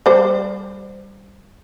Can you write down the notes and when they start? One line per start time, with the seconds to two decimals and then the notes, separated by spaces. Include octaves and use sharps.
0.06 G3 C5